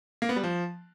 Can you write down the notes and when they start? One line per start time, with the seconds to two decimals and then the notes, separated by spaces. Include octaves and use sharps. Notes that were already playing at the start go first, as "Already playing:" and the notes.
0.22 A#3
0.29 B3
0.36 G3
0.43 F3